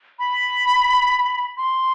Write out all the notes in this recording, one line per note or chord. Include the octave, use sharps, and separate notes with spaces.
B5
C6